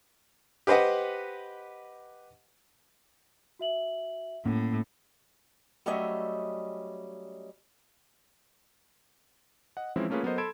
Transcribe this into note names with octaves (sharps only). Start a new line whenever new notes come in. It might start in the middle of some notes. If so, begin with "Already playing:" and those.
G4 B4 C5 D#5 F#5
F#4 E5 F#7
A2 A#3 C#4
F#3 G3 A3 C#4 D#5 E5
D#5 F#5
E3 F3 G#3 C4 C#4 E4
A3 A#3 C#4 F4 G#4 B4
F#3 B3 A4 A#4 C5 D#5
A4 B5 C6 G#6 D7 E7